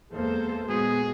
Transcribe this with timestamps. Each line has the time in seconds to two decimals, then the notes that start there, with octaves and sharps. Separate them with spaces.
0.11 E2 G#3 A#3 A4 C5
0.69 A#2 G#3 B3 F#4 G#4